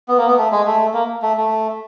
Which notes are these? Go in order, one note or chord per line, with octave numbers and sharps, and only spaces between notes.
B3
A#3
B3
A3
G#3
A3
A#3
A3
A3